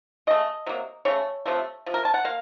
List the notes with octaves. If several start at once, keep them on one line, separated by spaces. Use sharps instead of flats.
C#3 A3 D#5
C3 F#3 A#3
C#3 A3 C#5
C3 F3 A3
C3 F3
A#4
A5
F#5
A#3 F5